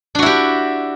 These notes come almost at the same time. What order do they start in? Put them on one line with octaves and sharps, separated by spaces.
D4 F#4 E4 G4